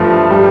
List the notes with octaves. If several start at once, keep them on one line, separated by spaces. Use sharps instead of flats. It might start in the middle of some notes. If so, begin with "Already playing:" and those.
Already playing: G2 F3 A3
G3